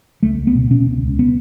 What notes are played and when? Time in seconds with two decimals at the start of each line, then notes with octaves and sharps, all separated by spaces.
0.23 C#2 A3
0.39 C#2
0.47 B3
0.55 B2
0.71 B2 C#4
0.87 C#2
1.03 C#2
1.19 B3